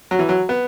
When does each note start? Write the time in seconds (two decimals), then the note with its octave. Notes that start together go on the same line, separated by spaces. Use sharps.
0.11 F#3
0.19 E3
0.29 F#3
0.49 B3